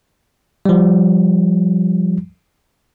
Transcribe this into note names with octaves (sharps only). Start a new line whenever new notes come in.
F3 G3